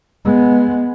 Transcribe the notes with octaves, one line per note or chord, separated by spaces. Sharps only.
G#3 B3